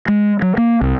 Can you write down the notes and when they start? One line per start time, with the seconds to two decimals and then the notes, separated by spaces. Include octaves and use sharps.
0.08 G#3
0.42 F#3
0.58 A#3
0.81 C2